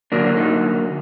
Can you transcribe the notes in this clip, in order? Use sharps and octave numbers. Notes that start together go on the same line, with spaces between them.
D3 F#3 A#3 D4
D#4